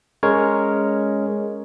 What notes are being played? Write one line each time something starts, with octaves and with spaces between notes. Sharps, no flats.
G#3 C#4 A#4 C#5